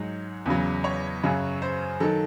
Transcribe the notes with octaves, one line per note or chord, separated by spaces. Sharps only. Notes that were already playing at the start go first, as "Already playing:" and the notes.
Already playing: G#2 F#3
E2 C#3 F#3
C#5
F#2 C#3 F#3
C5
D#3 F#3 A4